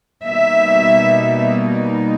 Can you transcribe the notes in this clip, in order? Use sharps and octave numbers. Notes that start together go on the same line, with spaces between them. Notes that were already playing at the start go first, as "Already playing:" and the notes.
B2 G3 A#3 D#4 E5